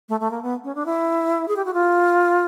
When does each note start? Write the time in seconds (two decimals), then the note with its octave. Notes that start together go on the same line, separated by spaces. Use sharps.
0.09 A3
0.20 A3
0.31 A#3
0.42 B3
0.64 C#4
0.75 D4
0.86 E4
1.48 G#4
1.56 G4
1.65 F#4
1.74 F4